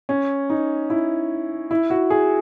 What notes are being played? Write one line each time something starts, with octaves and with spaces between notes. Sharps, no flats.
C#4
D#4
E4
E4
F#4
G#4